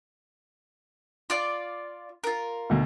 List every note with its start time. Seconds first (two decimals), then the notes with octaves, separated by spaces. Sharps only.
1.30 F4 D5 F5
2.24 F4 A#4
2.70 D2 B2